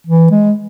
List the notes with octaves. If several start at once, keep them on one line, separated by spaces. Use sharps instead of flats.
E3
G#3